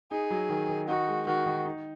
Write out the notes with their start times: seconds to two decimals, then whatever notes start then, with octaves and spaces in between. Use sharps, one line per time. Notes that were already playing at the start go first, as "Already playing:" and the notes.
0.11 D#4 G#4
0.31 F#3
0.50 D#3
0.69 D#3
0.88 D#4 F#4
1.08 G#3
1.27 D#3 F#4
1.46 D#3
1.65 D#4